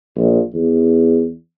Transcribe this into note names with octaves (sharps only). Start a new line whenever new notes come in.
A#1
E2